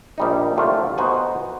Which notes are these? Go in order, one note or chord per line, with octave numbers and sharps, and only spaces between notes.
A#1 G3 D#4
C2 D3 F#3 A3 F4 G4
B3 D#4 F#4 C5 F#5 G#5